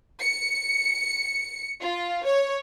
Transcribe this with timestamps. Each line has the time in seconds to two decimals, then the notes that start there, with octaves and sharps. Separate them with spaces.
0.21 C#7
1.82 F4
2.24 C#5